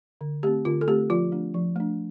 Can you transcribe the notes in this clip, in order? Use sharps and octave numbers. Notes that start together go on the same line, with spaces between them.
D3
A3 C4 G4
D3 F4
A4
A3 C4 G4
F3 F4
A3 D4
F3
A3 D4